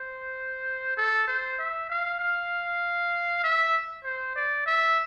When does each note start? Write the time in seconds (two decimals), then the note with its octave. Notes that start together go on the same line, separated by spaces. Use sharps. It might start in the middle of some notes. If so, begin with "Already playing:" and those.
Already playing: C5
0.97 A4
1.27 C5
1.59 E5
1.89 F5
2.19 F5
3.44 E5
4.04 C5
4.36 D5
4.66 E5